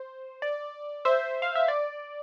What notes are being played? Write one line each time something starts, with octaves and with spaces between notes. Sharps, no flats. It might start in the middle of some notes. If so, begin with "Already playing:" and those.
Already playing: C5
D5
C5 E5
F5
E5
D5